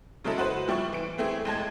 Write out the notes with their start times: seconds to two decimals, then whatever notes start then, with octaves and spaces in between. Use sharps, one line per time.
0.24 C#3 F#3 G#3 E4 A4
0.38 F#4 B4 C5
0.68 F3 G3 E4 C#6
0.93 E3 D7
1.18 E3 A3 C4 E4 G#4
1.45 D#2 G#3 A5 G#6